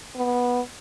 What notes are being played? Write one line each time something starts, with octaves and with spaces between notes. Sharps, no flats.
B3